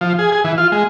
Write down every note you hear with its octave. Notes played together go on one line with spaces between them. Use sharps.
F3
G#4
G#4
E3
F4
G#3